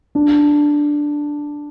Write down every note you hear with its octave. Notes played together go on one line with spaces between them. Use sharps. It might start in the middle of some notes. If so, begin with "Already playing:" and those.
D4